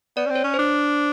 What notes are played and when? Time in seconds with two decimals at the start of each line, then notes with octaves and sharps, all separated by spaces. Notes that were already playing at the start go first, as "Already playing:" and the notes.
0.17 B3 D5
0.26 C#4
0.30 C4
0.35 C#5
0.44 C#4
0.54 C5
0.59 D4